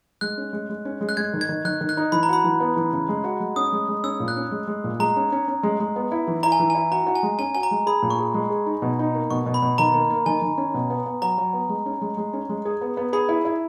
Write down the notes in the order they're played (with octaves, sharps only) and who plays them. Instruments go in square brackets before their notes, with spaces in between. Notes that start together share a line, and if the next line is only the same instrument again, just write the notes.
[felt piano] G#3 [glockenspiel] F#6
[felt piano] C#4
G#3
G#3
C#4
G#3
[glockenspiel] F#6
[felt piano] G#3 [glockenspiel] G#6
[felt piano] D#3
[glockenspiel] G#6
[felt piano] D#3
[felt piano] D#3 [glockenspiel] F#6
[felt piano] D#3
[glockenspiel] F#6
[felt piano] D#4
[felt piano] E3 [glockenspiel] B5
[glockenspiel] A#5
[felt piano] F#4 [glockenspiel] B5
[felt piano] E3
B3
E3
C#3
G#3
F#4
G#3
[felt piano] C#4 [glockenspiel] D#6
[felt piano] G#3
G#3
[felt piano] C#4 [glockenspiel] E6
[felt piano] A#2
[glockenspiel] F#6
[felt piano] C#4
G#3
G#3
A#2
[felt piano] G#3 [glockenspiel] A#5
[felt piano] C#4
C#4
C#4
G#3
G#3
B3
E4
E3
[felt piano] E4 [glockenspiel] A#5
[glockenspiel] G#5
[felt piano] E3
[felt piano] E4 [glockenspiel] G#5
[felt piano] F#4 [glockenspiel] A#5
[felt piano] F#4
[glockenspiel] G#5
[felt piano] G#3
[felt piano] C#4 [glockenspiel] G#5
[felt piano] F#4 [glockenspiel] G#5
[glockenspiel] A#5
[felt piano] G#3
[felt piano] G#4 [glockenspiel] B5
[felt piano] A#2
[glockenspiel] C#6
[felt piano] G#4
G#3
G#4
D#4
B2
D#4
A#3
[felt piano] B2 [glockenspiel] C#6
[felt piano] B2
[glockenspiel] B5
[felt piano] B2
[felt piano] D#3 [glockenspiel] A#5
[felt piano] A#3
A#3
[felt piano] D#3 [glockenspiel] G#5
[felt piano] D#3
C#4
B2
B3
B3
[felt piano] F#3 [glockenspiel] A#5
[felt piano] F#3
B3
G#3
C#4
G#3
G#3
C#4
G#3
G#4
B3
B3
[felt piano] G#4 [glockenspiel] B5
[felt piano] E4
E4